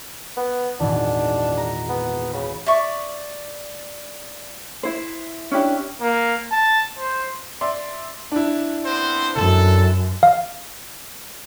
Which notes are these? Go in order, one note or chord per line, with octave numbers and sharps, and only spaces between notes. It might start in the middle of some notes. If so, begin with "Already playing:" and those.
B3
G#1 E2 A#2 D4
A#5
B3
C#3 B5
D5 E5 C#6
E4 C5
C#4 D4 E4 G4
A#3
A5
C5
D5 E5 C6
D4 E4
B3 C4 C5
F#2 A4
F5